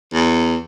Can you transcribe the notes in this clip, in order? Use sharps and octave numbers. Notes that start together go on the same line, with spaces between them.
E2